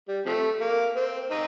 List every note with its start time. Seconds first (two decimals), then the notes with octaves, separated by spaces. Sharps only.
0.08 G3
0.26 C3 F3 A3
0.60 A#3
0.96 C4
1.30 C4 D#4